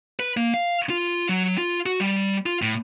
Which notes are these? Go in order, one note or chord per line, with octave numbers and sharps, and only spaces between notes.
B4
A#3
F5
F4
F#3
F4
F#4
G3
F4
A2